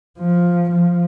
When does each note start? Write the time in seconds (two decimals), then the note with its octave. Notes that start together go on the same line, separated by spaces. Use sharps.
0.19 F3
0.72 F3